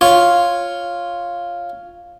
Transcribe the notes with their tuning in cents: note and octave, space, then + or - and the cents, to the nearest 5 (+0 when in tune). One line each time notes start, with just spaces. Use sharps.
F4 +0 C#5 +0